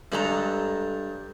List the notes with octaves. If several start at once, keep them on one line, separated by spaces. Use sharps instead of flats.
G2 G#3 A4 A#5